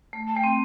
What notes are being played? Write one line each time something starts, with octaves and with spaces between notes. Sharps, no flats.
A3
A5
A3 G5
C4